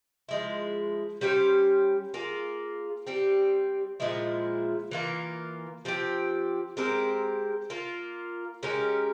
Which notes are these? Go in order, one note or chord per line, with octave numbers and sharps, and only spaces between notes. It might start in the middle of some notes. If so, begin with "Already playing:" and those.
F3 G#3 E4
G3 C#4 G4 C5
A#3 F4 G#4
G3 C4 G4
A#2 F3 G#3 E4
E3 A#3 F4 A#4
F3 C4 G4
G#3 C4 G4 A#4
A#3 F4 A#4
G#3 C#4 G4 A#4